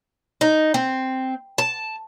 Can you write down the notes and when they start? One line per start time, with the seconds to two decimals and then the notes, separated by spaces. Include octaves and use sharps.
0.41 D#4
0.74 C4
1.58 A5